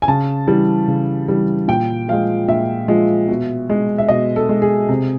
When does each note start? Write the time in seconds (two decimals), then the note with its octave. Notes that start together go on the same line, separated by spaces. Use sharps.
0.02 G#5
0.08 C#3 A5
0.47 E3 G3
0.88 C#3
1.28 E3 G3
1.68 A#2 G5
2.08 F3 G#3 F5
2.48 A#2 E5
2.88 F3 G#3
3.28 B2
3.70 G#3
3.98 E5
4.08 B2 D#5
4.36 A4
4.49 G#3
4.62 G#4
4.89 C3